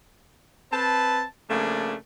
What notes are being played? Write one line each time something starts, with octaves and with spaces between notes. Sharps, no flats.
C4 B4 A5
C#3 F3 A3 A#3 D4